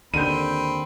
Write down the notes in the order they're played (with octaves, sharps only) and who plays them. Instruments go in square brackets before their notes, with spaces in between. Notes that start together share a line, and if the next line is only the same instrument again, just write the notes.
[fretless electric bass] D#2 D3 [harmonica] C4 B5 [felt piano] G6 D#7